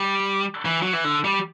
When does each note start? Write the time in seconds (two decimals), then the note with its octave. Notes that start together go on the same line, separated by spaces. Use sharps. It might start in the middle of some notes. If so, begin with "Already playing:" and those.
Already playing: G3
0.65 E3
0.82 F#3
0.93 E3
1.04 D3
1.24 G3